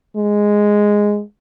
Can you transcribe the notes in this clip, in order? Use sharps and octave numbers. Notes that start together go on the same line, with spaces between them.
G#3